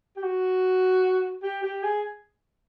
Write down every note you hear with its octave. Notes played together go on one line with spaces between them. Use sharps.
G4
F#4
G4
G4
G#4